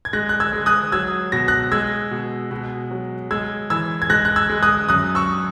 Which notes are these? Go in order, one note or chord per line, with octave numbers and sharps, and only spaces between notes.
G#6
G#3 F#6 A#6
F#6
E6 G#6
G#3
D#6 F#6
F#3 E6 G#6
B2 A#6
F#6 A#6
G#3 E6 G#6
B2
B2
F#3
G#3 E6 G#6
E3 E6 G#6
G#6
G#3 F#6 A#6
F#6
E6 G#6
G#3
D#6 F#6
F#2 D#6 F#6
C#6 E6